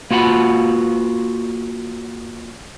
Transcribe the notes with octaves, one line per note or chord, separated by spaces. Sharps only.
A#3 F4 F#4 F#5 B5